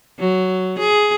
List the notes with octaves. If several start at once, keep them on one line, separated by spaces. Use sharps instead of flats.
F#3
G#4